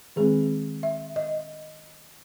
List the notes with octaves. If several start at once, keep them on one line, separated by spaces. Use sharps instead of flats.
D#3 G#3 C4 G#4
E5
D#5